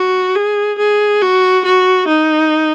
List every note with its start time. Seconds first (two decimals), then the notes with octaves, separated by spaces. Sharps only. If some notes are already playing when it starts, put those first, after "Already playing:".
Already playing: F#4
0.35 G#4
0.78 G#4
1.21 F#4
1.65 F#4
2.08 D#4